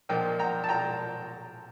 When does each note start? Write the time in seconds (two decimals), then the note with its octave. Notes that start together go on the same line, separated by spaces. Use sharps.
0.09 A#2 F3 A#3 D4 D#5 G5
0.39 G5 A#5
0.64 A5
0.69 G5 A#5